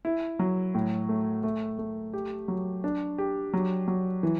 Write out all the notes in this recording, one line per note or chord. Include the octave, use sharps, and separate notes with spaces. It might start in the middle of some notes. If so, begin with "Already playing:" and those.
E4
F#3
A2
A3
A3
A3
G4
F#3
D4
G4
F#3
F#3
E3